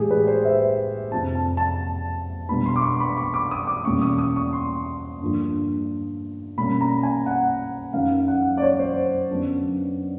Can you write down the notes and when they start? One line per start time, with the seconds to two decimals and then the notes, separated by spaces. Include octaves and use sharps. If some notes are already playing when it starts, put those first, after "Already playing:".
Already playing: A2 E3 G#3 G4 G#4
0.11 B4
0.27 C5
0.45 E5
1.12 F2 C3 F3 A5
1.35 A5
1.57 A5
2.49 B2 G3 B3 D4 B5
2.66 C6
2.76 D6
2.82 C#6
3.00 B5
3.17 C#6
3.34 D6
3.51 D#6
3.67 D6
3.85 E2 B2 G3 A#3 C#4 C#6
4.02 D#6
4.19 D#6
4.36 C#6
4.53 C6
5.21 G2 D3 F3 A#3
6.57 B2 G3 A#3 C#4 B5
6.81 A#5
7.03 G#5
7.26 F#5
7.93 F#2 D#3 F#3 F5
8.28 F#5
8.57 D5
8.62 C#5
8.79 C5
9.31 F#2 D3 F#3 B3 D4